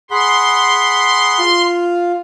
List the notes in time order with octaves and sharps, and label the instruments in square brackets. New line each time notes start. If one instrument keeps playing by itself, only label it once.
[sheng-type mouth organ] G#4 F#5 B5 [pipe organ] C6
[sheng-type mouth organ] F4